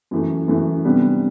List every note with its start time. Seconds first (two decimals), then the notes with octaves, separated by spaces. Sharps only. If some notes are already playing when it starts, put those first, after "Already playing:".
0.11 F#2 E3 A3
0.48 F#2 E3 A3
0.85 C3 G3 B3 D4